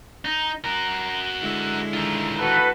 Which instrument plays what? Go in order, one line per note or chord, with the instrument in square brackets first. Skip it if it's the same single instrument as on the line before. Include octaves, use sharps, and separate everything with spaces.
[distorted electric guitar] D#4
F#4 A#4
[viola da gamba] D3 G#3 E4
[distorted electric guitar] D#3 F4
[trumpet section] F#4 A4 B4